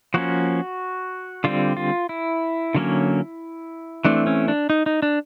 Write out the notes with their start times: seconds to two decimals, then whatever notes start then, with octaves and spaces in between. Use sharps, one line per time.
0.14 F3 A#3 C#4 F#4
1.44 D3 G3 C4 F4
1.77 F4
2.09 E4
2.75 D3 F#3 A#3 C#4
4.05 E3 A3 C4 D4
4.27 C#4
4.48 D4
4.70 D#4
4.86 D#4
5.02 D4